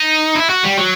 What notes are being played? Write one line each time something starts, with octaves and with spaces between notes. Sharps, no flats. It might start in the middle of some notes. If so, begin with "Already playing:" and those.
Already playing: D#4
E4
F#4
G3
F#3